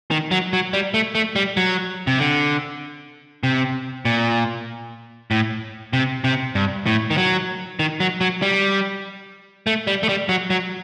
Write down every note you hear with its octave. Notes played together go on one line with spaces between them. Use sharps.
D#3
F#3
F#3
G3
A3
A3
G3
F#3
C3
D3
C3
A#2
A2
C3
C3
G2
A2
D#3
F#3
D#3
F#3
F#3
G3
A3
G3
A3
G3
F#3
F#3